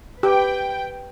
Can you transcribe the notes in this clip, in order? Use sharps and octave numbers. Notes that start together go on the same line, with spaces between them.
G4 B4 G5